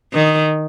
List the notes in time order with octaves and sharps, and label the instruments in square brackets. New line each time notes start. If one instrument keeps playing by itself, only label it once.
[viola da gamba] D#3